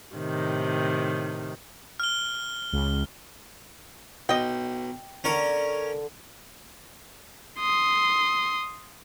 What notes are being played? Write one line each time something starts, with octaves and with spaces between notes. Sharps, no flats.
A2 C3 D#3
F6 G7
C#2
B1 D#5 G5
D3 C#4 A#4 C#5
C6 D#6